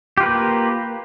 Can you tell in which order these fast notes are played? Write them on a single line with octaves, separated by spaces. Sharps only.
G4 F4 B4 A#3